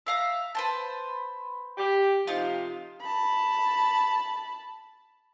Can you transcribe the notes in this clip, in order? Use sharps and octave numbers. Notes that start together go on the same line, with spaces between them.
E5 F5 A#5
B4 C5 A5
G4
C3 F3 D#4 F4
A5 B5